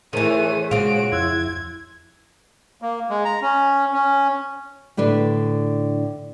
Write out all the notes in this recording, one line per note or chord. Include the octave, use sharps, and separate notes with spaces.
D#3 E3 A3 G#4 C5 C#5 D#7
A#2 C#3 G#3 F4 F#4 D7
F2 E4 C6 E6 F#6 G#6
A#3
G#3
A#5
C#4
C#4
A2 D3 D4 B4